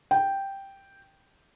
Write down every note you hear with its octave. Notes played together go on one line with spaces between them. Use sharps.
G5